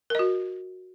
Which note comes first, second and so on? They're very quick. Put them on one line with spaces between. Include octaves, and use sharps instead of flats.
A#4 D#5 F#4